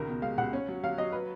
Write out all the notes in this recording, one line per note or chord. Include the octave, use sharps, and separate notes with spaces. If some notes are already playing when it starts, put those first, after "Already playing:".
Already playing: C#2 D#3 A#4
B2
G#3 F5
C#2 F#5
C#4
F#3
F#3 F5
F#3 D#5
B4